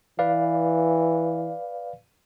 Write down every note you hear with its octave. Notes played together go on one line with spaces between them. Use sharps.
E3 B4 D5 F5